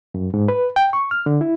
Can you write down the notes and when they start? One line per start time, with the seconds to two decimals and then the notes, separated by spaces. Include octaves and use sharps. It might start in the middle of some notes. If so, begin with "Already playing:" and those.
0.14 F#2
0.34 G#2
0.48 B4
0.76 G5
0.93 C#6
1.11 F6
1.26 D3
1.41 E4